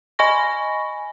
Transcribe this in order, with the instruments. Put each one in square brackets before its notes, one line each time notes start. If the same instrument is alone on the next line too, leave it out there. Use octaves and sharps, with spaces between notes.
[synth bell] D#5 G#5 B5 C#6 A#6